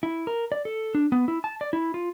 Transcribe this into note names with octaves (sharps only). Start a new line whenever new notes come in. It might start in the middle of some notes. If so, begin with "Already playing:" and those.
E4
A#4
D5
A4
D4
B3
E4
A5
D5
E4
F4